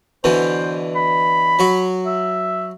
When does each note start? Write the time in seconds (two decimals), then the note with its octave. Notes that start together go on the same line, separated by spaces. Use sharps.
0.24 B2 D3 E3 C5
0.96 B5
1.59 F#3 F#4
2.06 E5